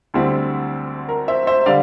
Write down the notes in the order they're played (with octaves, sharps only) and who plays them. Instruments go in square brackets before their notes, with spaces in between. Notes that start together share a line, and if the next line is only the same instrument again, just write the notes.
[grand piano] D2 D3 G3 C4 E4
A#4
C5 E5
C5 E5
D3 G3 D5 F5